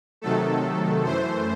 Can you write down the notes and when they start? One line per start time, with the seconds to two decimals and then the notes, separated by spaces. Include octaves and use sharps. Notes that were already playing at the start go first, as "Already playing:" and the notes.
0.22 C3 D#3 F#3 A3 A4
1.04 F#2 E3 A3 C5